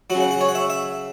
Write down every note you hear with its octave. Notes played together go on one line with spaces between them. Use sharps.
F#3 F#5
C#3
F#5
F#5
C#5
F#5
E5
E5